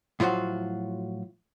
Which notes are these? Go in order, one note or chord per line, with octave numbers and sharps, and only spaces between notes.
A2 F3 F#3 F4 F#4